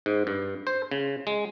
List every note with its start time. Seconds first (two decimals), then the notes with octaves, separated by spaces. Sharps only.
0.06 G#2
0.27 G2
0.67 C5
0.91 C#3
1.27 G#3